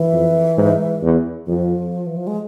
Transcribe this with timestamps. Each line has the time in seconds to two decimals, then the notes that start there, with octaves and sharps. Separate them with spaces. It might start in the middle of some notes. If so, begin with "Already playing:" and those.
Already playing: E3
0.13 F2
0.58 G#2
1.02 E2
1.47 F2 F3
2.06 E3
2.17 F3
2.27 G#3